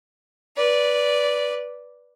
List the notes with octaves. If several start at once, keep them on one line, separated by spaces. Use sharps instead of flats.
B4 D5